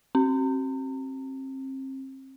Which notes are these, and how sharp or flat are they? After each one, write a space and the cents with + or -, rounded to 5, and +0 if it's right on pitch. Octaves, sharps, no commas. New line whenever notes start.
C4 +35